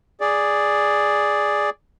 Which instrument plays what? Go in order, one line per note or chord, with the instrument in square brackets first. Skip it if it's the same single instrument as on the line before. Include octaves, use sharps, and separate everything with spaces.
[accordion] G#4 D5